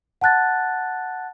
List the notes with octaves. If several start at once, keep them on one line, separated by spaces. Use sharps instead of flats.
F#5 A5 F#6 A6